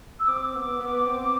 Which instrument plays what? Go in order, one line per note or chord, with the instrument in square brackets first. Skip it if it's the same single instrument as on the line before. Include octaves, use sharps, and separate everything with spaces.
[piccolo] E6
[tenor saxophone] C4 [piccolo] D6
[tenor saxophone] B3
B3
C4